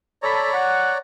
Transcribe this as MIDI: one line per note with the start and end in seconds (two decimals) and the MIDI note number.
0.23 0.48 69
0.23 0.98 73
0.23 0.98 74
0.23 0.98 82
0.23 0.48 83
0.53 0.92 78